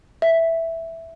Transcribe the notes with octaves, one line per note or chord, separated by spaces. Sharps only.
E5